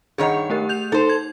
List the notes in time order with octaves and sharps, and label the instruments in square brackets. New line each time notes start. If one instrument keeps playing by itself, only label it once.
[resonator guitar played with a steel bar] G2 D#3 C#5 [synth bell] G#4 F#5
[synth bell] A3 G4 A#4
G6 F7
[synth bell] D#4 [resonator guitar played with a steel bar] A4 C5
[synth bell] G#6